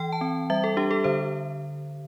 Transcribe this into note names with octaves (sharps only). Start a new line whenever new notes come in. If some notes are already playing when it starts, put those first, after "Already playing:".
Already playing: E3 G5
A5
C4
G3 E5
A4
D4 G4
A4
D3 C5